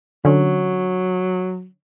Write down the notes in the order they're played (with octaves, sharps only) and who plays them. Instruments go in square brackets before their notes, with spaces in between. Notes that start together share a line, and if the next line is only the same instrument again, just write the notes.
[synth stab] D3 C#4 [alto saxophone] F#3